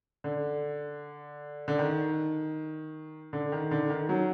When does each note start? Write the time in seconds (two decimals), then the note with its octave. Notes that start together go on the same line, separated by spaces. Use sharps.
0.24 D3
1.68 D3
1.78 D#3
3.33 D3
3.52 D#3
3.71 D3
3.90 D#3
4.09 F#3